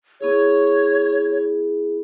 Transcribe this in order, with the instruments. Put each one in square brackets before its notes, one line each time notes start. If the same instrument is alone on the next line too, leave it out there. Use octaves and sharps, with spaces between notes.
[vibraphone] B3 E4 G#4 [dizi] C#5